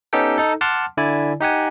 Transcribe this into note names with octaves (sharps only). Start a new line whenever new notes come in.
B3 C#4 D#4 G4 A4 G5
D#4 A4
F#5 A5 C6 D6 F6
D3 E4 D5 G#5
D#4 G4 F#5 G#5